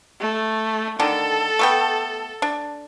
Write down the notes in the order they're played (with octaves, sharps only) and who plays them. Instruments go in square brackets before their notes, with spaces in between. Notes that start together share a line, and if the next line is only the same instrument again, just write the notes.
[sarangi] A3
[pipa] D3 D#3 D4 [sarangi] A4
[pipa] A3 B3 G5
D4